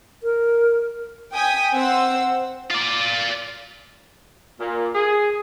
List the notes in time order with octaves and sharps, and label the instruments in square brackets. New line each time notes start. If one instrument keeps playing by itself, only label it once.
[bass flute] A#4
[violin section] G5 G#5 D#6 B6
C4 C5 F#5 E6
[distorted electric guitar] F4 D5
[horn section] A#2
G#4